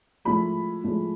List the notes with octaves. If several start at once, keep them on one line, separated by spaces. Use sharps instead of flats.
A2 F3 G#3 B5
A2 F3 G#3